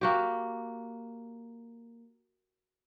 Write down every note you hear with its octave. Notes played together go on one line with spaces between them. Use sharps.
A#3 F#4 G4